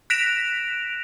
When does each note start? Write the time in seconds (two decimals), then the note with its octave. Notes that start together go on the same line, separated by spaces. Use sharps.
0.10 F#6 A#6 B6 D7 E7 F7